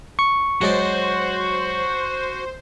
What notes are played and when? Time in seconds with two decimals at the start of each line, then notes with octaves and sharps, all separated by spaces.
0.19 C#6
0.61 F#3 G#3 F#4 C5 D5